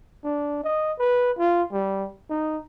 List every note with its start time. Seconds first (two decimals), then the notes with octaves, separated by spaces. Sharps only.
0.24 D4
0.64 D#5
0.99 B4
1.38 F4
1.72 G3
2.30 D#4